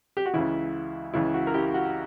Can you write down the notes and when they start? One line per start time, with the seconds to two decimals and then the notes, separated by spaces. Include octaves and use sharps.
0.17 G4
0.26 F#4
0.33 C#2 C#3 E3 E4
1.14 C#2 C#3 E3 E4
1.34 F#4
1.47 A#4
1.54 E4 G4
1.74 F#4